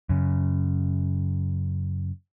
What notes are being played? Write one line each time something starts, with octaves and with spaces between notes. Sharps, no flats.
F#2 C#3